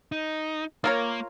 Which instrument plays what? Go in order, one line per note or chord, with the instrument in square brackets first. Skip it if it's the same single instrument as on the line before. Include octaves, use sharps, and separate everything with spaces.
[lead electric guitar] D#4
[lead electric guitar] A#3 [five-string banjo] F4 A#4 C#5